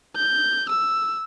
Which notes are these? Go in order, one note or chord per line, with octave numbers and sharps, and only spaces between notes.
G6
E6